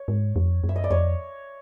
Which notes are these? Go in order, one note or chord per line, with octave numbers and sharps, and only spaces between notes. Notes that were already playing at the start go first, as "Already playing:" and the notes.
Already playing: C#5
G#2
F2
F#2
E5
D#5
D5
F2 C#5